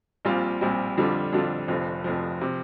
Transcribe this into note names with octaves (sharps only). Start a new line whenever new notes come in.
A#1 A#2 G3 C4 F4
A#1 A#2 G3 C4 F4
F2 D3 G3 D4 F4
F2 D3 G3 D4 F4
F1 F2 F3
F1 F2 F3
C3 F3